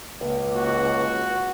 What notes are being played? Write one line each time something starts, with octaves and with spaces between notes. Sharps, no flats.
C#2 A#3
F#4